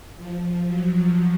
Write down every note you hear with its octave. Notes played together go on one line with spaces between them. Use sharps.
F3
F#3